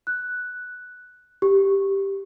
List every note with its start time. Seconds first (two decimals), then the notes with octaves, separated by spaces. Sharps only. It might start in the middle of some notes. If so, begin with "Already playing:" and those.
0.07 F#6
1.42 G4